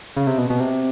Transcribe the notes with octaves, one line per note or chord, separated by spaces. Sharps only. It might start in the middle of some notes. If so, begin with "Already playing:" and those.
C#3
C3
B2
B2
C3